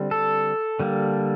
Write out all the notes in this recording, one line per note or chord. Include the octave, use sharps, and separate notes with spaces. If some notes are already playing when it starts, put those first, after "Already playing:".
Already playing: D3 G3 C4
A4
D3 G3 A#3